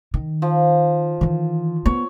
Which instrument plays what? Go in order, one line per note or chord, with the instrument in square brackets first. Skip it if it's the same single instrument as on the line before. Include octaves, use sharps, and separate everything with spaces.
[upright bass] D#3
[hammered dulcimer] F3
[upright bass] D#3 E3
[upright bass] B3 [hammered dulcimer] C#5